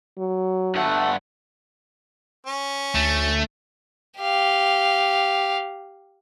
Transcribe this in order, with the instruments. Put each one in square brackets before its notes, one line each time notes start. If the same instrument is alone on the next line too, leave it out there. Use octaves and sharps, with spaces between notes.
[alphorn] F#3
[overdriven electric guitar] G2 F#5 [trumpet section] A3
[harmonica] C#4
[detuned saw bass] D2 [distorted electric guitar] A3
[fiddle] G4 F5